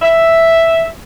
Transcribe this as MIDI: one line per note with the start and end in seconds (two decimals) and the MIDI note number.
0.02 0.86 76